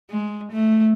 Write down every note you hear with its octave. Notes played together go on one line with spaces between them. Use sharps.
G#3
A3